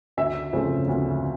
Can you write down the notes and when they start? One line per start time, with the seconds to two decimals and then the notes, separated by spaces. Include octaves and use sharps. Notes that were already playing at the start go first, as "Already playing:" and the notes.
0.17 D2 E5
0.52 C#3 F3 A3 C4
0.88 D2